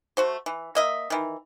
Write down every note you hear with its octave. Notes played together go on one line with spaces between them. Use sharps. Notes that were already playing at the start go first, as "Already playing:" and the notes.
A3 F#4 C5
E3
A#3 D#5 E5
D#3 E3